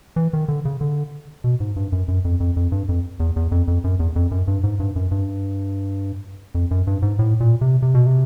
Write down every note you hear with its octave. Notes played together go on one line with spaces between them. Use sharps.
E3
D#3
D3
C#3
D3
B2
G#2
G2
F#2
F#2
F2
F2
F2
G2
F2
E2
E2
F2
F2
F#2
E2
F2
F#2
G2
G#2
G2
F#2
G2
F2
F#2
G2
G#2
A2
A#2
C3
C3
B2
C3